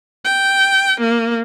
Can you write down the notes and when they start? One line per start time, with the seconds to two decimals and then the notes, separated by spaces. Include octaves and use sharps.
0.25 G5
1.00 A#3